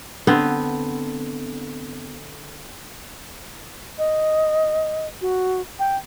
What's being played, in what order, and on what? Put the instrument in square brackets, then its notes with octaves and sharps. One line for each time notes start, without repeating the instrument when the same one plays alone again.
[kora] D3 B3 C4
[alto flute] D#5
F#4
G5